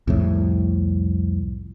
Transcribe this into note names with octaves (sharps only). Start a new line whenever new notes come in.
C2 F2 A2